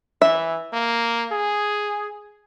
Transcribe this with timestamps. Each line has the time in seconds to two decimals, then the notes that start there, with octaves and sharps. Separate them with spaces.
0.22 E3 E5
0.73 A#3
1.32 G#4